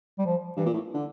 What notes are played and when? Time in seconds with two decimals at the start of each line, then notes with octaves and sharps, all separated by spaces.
0.18 G3
0.26 F3
0.57 G2 E3
0.66 A#2
0.74 A2
0.94 D3